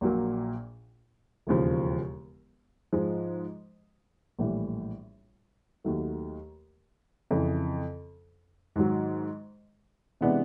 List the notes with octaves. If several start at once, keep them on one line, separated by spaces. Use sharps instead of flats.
A#1 A#2 F#3 A#3
E1 D#2 C#3 F3
G#2 F3 G#3
A#1 A2 E3 G3
D#2 D#3 F#3 A3
F2 C#3 E3
G#2 D#3 F#3
C3 E3 G#3 B3 D4